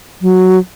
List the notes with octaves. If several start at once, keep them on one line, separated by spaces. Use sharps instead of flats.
F#3